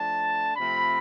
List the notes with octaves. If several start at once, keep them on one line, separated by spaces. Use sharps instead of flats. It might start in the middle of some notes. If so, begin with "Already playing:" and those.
Already playing: F3 A3 D4 A5
C3 F3 A3 C4 B5